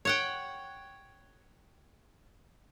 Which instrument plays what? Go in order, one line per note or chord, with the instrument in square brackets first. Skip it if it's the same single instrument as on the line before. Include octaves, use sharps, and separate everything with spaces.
[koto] C#5 F#5 G5